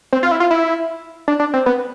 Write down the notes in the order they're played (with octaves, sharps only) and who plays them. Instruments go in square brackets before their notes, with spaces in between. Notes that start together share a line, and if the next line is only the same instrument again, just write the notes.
[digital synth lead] C4
F4
E4
F4
E4
D4
D4
C4
B3